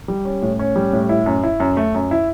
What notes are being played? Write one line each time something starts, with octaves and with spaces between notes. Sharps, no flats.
G3
C#4
A2
C#4
G3
A2
E4
F#2
E4
F#2
A3
F#2
E4